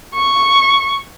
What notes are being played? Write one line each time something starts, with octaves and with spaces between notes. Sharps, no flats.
C#6